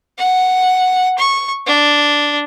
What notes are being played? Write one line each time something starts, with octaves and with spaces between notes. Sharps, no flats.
F#5
C#6
D4